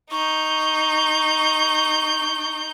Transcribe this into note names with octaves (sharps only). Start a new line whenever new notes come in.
D#4 C#6 G6